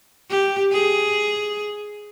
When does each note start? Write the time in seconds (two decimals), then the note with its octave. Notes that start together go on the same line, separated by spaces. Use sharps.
0.30 G4
0.72 G#4